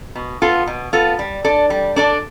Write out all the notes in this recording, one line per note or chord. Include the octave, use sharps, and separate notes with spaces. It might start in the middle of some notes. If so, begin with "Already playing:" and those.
B2
B3 F4 A4
B2
B3 F4 A4
G3
D4 A4 D5
G3
D4 A4 D5